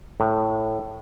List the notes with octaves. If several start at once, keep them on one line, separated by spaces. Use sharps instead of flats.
A2